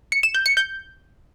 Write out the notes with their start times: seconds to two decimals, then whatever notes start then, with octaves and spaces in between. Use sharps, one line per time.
0.12 C#7
0.23 E7
0.34 G6
0.46 C#7
0.57 G6